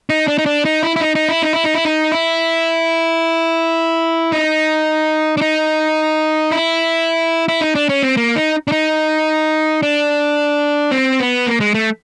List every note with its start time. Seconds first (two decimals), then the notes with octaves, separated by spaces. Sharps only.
0.10 D#4
0.28 D4
0.38 D#4
0.46 D4
0.65 D#4
0.83 E4
0.96 E4
1.01 D#4
1.15 D#4
1.29 E4
1.42 D#4
1.53 E4
1.64 D#4
1.74 E4
1.85 D#4
2.12 E4
4.32 D#4
5.37 D4
5.41 D#4
6.51 E4
7.48 E4
7.61 D#4
7.75 D4
7.89 C#4
8.03 C4
8.17 A#3
8.36 D#4
8.68 D4
8.72 D#4
9.83 D4
10.91 C4
11.20 B3
11.46 A#3
11.60 G#3
11.74 A3